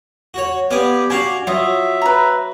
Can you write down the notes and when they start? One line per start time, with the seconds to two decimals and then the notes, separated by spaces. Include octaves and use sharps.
0.34 F#4 C#5
0.71 B3 G4 D5 F5 G#5
1.10 D4 F#4 F5 G#5
1.47 F#3 F4 E5 D#6
2.02 B4 A#5